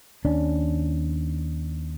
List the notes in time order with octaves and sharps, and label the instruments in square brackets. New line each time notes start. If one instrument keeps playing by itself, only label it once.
[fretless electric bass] D#2 C#4 D4